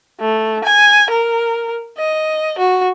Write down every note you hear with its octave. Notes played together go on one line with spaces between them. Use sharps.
A3
G#5
A#4
D#5
F#4